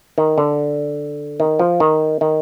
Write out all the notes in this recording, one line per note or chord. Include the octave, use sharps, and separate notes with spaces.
D#3
D3
D#3
F3
D#3
D#3